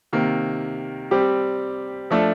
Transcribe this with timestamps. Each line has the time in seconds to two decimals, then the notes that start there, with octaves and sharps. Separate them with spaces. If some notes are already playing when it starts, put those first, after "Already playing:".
0.13 C3 D#3 A#3
1.11 G3 C4 G4
2.11 F3 A3 D4 A4